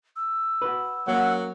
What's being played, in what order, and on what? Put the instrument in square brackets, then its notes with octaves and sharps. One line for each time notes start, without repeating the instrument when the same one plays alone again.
[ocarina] E6
[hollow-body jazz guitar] F#4 B4
[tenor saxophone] F#3 [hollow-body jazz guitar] A#3 C#4 [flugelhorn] F#5